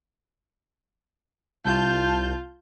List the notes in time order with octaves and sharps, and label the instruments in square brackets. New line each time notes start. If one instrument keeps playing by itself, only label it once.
[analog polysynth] C2 A5 G6 [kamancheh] F4